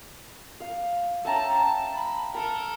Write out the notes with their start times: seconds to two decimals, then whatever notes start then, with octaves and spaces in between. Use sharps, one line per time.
0.60 F5
1.25 C#4 E5 G5 A5 A#5
1.57 A5
1.95 B5
2.35 A4 A#4 A5